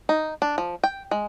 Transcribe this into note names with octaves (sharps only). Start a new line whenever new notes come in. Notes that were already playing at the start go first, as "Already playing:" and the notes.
D#4
D4
F3
G5
G#3